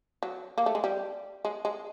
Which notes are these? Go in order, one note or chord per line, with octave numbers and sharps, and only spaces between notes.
F#3
A#3
A3
G#3
G3
G#3
G#3